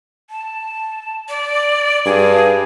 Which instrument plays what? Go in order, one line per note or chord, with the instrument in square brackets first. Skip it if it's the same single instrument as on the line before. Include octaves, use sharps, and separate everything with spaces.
[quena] A5
D5
[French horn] G2 [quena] G#4